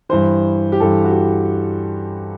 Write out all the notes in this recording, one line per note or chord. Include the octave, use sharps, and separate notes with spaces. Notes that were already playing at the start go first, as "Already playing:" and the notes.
G2 E3 C5
G4
G2 E3 A4
F#4
G4